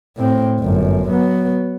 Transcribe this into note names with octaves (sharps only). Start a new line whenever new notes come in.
A2 C4
G1 F#2
F#3 B3